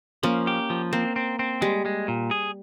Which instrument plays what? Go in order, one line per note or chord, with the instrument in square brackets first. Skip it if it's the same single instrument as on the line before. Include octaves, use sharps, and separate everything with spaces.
[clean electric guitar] F3 [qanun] A#3 C#4
[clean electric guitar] G4
F3
[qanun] A#3 [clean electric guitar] C4
[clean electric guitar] C4
C4
[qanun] G3 [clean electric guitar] G#3
[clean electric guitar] G#3
A#2
G#4